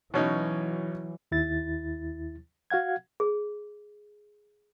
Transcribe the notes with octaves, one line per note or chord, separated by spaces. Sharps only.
B2 E3 F#3 C#4 D#4
D#2 E4 A6
F#4 F5 F#5 G#6
G#4